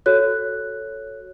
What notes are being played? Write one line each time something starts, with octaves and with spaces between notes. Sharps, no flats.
F#4 A4 C#5 F#6